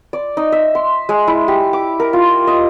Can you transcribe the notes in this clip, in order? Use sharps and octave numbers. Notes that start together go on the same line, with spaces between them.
D5
D#4
E5
C6
G#3
E4
G4
D6
A#4
F4
D#5